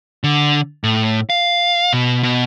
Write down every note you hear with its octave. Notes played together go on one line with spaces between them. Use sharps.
D3
A2
F5
B2
B2